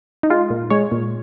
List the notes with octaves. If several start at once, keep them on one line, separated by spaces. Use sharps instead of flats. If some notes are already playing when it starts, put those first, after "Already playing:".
D#4
G#3 F4
A#2
G#3 C#5
A#2